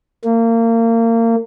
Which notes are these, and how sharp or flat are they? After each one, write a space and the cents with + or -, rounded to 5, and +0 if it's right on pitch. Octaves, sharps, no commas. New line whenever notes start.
A#3 -30